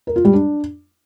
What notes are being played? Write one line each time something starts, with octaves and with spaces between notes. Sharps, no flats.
A#4
F4
G3
D4